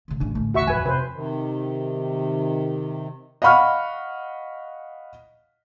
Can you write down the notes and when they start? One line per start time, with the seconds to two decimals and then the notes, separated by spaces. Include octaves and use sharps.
0.08 D2 C#3
0.20 A1 C#3 D4
0.35 D2 A2 C#3 A3
0.54 D#1 A1 F#4 E5 C#6
0.67 F2 B4 G#5
0.86 C3 B4 C5
1.14 C3 D#3
3.42 D#5 F5 F#5 B5 C#6 F6